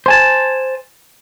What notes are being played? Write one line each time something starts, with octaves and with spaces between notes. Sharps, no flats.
C5 G#5 A5